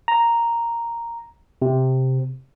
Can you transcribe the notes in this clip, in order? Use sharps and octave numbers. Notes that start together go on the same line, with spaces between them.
A#5
C3